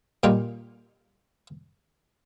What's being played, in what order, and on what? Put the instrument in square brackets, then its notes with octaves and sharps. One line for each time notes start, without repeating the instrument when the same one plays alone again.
[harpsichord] A#2 G3 D#4 F4 G4